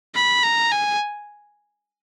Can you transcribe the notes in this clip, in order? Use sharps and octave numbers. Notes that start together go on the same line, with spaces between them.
B5
A#5
G#5